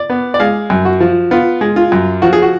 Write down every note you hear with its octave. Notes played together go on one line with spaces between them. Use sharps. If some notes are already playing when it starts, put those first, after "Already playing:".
Already playing: D5
B3
D5
G#3 F5
F#2
F#4
F3
B3 F4
G#3
F4
F#2
F3 F#4
G#4
F#4